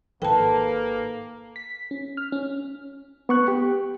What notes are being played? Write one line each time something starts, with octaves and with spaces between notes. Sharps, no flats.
G#1 D#3 A#3 A4 B4 G5 A5
B6
C#4
F6
C#4
B3 C#6 F#6
G4